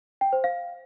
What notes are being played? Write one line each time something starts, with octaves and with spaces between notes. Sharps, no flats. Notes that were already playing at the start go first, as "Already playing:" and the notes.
G5
C5
F5